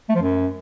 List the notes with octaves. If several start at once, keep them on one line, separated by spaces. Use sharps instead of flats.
A3
F3
F#2